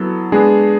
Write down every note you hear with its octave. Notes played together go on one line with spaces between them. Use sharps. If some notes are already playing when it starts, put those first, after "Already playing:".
Already playing: F#3 B3 E4 A4
G#3 B3 D4 G#4